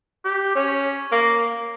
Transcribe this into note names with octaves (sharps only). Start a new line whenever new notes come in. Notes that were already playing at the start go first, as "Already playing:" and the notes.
G4
C#4
A#3